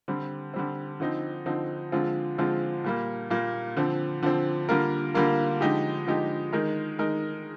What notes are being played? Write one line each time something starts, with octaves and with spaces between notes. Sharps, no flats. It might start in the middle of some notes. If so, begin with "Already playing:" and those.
D3 G3 C4
D3 G3 C4
D3 F3 C4 D#4
D3 F3 C4 D#4
D3 F3 G#3 C4 F4
D3 F3 G#3 C4 F4
A#2 G3 A#3
A#2 G3 A#3
D3 F3 C4
D3 F3 C4
D3 G3 A#3 F4 A#4
D3 G3 A#3 F4 A#4
D3 F3 G#3 D#4 G4
D3 F3 G#3 D#4 G4
D#3 G#3 D#4 A#4
D#3 G#3 D#4 A#4